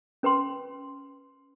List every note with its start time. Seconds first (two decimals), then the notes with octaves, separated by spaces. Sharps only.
0.23 C#4 B4 G5 C6